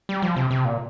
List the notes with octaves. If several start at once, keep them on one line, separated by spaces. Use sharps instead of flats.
G3
F3
C3
C3
A#2